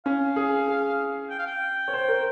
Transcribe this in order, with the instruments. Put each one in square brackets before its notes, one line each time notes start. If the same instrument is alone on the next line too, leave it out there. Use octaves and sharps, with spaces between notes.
[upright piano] C#4 [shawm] F5
[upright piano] G#4
G#4
[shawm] G5
F5
G5
[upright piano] C#5
C5
A#4